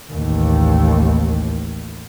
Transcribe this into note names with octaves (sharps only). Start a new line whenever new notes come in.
A1 D#2